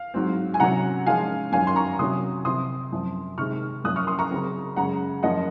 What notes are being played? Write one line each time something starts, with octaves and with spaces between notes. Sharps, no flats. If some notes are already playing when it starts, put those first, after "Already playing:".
Already playing: F5
G#2 F#3 C4
G#5
C3 F#3 C#4 F#5 A#5
G#2 F3 G#3 C#4 F5 G#5
F#2 D#3 F#3 C#4 F5 G#5
C6
A#5 C#6
C3 F#3 C#4 C6 D#6
C3 F3 C4 C6 D#6
F#2 F3 C4
C3 D#3 G#3 C4 C#6 F6
F#2 F3 A#3 C#4 D#6 F#6
C#6 F6
C6 D#6
A#5 C#6
C#3 F#3 C4
F#2 C#3 G#3 C#4 F#5 A#5
F#2 F3 A#3 C#4 D#5 F#5